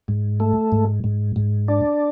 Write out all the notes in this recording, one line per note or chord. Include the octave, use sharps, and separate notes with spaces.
G#2
A3
G#2
G#2
G#2
D4